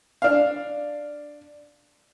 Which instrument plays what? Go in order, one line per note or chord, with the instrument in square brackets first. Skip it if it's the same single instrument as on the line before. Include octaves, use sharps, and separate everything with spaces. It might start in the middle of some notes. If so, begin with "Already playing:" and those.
[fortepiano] D4 F5